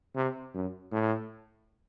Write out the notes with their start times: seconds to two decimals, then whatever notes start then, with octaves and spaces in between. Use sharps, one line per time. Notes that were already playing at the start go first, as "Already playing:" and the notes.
0.16 C3
0.54 F#2
0.92 A2